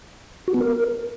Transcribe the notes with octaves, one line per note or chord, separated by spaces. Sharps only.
F#4
B3
A#4